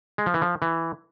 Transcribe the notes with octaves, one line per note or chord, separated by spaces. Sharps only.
G#3
F3
E3
F3
E3